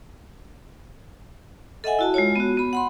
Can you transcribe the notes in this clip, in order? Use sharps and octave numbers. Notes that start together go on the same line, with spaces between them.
A4 D#5 E5 F#5 G#5
E4 F#4 A5
G#3 F4 C#5
B3 F#4
B3 B5
F#5 B5 C6